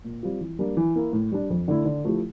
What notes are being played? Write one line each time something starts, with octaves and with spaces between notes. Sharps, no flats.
A#2
G3 C4 F4
E3
G3 A#3 D4
E3
A#3 E4
A2
G3 D4
F2
D3 A3 E4
D3
F3 A3 E4 G4